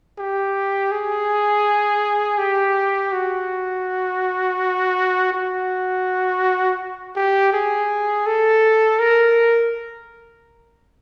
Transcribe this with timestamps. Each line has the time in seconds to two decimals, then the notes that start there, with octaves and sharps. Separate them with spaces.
0.18 G4
0.91 G#4
2.38 G4
3.12 F#4
5.32 F#4
7.16 G4
7.53 G#4
8.26 A4
8.99 A#4